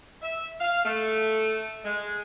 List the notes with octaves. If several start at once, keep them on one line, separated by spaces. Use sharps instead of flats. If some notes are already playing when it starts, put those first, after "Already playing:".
E5
F5
A3
G#3